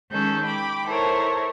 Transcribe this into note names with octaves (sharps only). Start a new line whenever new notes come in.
D#3 G#3 C#4 A4 G6
G5 B5 D6
E4 A4 A#4 C5 C#5